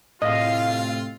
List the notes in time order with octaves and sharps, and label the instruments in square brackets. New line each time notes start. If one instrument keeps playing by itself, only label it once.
[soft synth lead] A2 [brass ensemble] C3 C4 F4 [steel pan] D#5 [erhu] F5